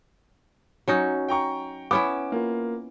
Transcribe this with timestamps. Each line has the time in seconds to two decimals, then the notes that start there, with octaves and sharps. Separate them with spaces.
0.88 F#3 C#4 D#4
1.29 G5 A#5 C#6
1.91 B3 C#4 E4 D6
2.32 A#3 F4